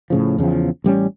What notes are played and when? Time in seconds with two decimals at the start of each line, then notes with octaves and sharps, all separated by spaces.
0.10 A2 C#3 F3
0.38 E2 C#3 E3 F3
0.84 A1 G3 A#3 C#4